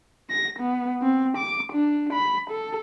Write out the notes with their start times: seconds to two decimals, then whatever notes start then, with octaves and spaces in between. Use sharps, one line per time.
0.30 A#6
0.59 B3
1.02 C4
1.37 D6
1.73 D4
2.13 B5
2.50 A4